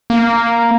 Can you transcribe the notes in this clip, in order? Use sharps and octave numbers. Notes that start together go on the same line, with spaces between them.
A#3